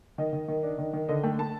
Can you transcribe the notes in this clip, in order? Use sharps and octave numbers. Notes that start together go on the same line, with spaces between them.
D#3 D#5
D#3
D#3
D4
D#3
D#3
D3 D#5
A3 G5
A3 A5